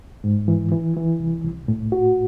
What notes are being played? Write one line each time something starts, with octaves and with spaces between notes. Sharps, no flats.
G#2
E3
E3
E3
C2
C2
A2
F#4